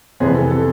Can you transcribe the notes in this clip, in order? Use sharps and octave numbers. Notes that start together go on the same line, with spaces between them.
F2 C3 E3 B3 G#4
A4
A4